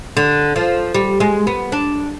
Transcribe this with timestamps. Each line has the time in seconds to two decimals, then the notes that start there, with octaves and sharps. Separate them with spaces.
0.17 D3
0.56 F3
0.94 G3
1.20 G#3
1.47 B3
1.72 D4